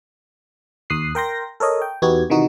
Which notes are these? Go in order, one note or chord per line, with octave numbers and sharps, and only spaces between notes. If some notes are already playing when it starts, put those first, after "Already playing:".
D#2 D#6 F#6 C7
A#4 G5 C6 A#6
A4 A#4 C#5 D#5
G5
E2 B3 D#4 F#4 G4 G#6
C3 D#3 E3 D#4 F#4